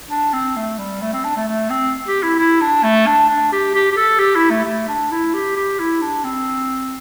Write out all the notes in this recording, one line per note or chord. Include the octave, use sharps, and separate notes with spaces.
D4
C4
A3
G3
A3
C4
D4
A3
A3
C4
G4
E4
E4
D4
A3
D4
D4
G4
G4
G4
A4
G4
E4
A3
A3
D4
E4
G4
G4
E4
D4
C4